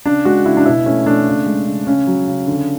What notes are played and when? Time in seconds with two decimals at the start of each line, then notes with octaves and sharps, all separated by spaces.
0.06 C#3 D4
0.25 G#3 F#4
0.45 C#3 E4
0.57 D4
0.66 B2 E4
0.86 A3 C#4
1.06 A3 D4
1.27 C#3
1.46 G#3
1.67 C#3
1.87 C#3 C#4
2.07 F#3
2.27 C#3
2.48 D3